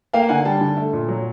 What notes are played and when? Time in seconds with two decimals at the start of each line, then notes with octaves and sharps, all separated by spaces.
0.13 A#3 F5 G5
0.29 D3 F#5 G#5
0.45 G3 G5 A5
0.61 D3
0.77 A3
0.93 A#2
1.08 F#3